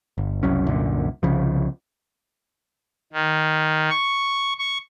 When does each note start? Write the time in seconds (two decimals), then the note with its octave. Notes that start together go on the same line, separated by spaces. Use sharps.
0.18 G1
0.43 F#1 C2 F#3 C#4
0.68 C2 F#2 A#2 D3
1.23 C2 C#3 F3
3.13 D#3
3.90 C#6
4.59 C#6